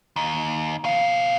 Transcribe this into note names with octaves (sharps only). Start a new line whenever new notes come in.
D#2
B2 F5